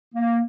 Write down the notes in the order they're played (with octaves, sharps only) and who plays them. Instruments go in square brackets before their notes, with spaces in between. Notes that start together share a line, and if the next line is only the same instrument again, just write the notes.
[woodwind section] A#3